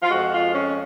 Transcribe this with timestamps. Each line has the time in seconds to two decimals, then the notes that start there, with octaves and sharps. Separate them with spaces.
0.03 F4
0.10 F2 F3 G#3 F#4
0.33 F4
0.55 C#4